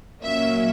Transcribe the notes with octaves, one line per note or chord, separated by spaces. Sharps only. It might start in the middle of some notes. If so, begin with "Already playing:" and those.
A#2 F#3 A#3 C#4 E5